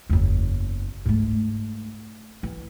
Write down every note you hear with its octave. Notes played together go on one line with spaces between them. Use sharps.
F#1 E2
G#2 A3
E3